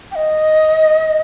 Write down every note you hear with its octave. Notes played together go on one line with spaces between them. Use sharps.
G5
D#5